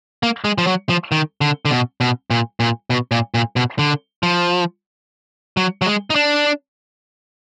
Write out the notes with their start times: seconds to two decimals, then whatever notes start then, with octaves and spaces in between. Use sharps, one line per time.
0.23 A#3
0.44 G#3
0.58 F3
0.67 F#3
0.89 F3
1.12 D#3
1.41 D3
1.65 D3
1.71 B2
2.01 B2
2.31 A#2
2.60 A#2
2.90 B2
3.11 A#2
3.34 A#2
3.56 B2
3.79 D3
4.23 F3
5.57 F#3
5.82 F#3
5.86 G#3
6.10 D#4
6.15 D4